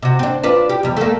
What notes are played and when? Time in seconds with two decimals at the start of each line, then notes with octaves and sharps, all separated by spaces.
0.03 C3 F#4
0.19 C4 D4
0.43 D4 F4 B4
0.69 G4
0.83 E2 G3
0.96 A3 A#3